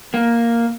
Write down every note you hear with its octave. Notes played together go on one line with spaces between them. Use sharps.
A#3